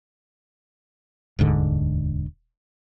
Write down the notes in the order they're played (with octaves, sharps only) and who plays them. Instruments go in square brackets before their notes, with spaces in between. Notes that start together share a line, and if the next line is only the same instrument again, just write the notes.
[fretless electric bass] E1 D2 G#2 D3